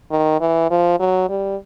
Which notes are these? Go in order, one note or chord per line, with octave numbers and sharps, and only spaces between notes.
D#3
E3
F3
F#3
G3